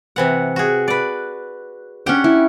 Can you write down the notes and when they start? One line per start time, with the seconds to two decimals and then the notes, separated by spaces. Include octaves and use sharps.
0.16 C3 E3 F#5
0.56 F#4 G#4
0.88 B4 D5
2.06 C#4 D4 G4 F#5 G5
2.24 E4